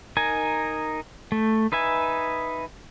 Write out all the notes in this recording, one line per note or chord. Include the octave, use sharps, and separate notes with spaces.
D#4 A#4 G#5
A3
D#4 B4 E5 G#5